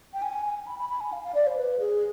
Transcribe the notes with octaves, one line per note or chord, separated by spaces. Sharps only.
G5
G#5
G#5
B5
B5
B5
G#5
F5
F5
D5
C5
B4
G#4